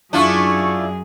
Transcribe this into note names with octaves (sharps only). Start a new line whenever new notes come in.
F#2 D4 E4 F4 G#4 C#6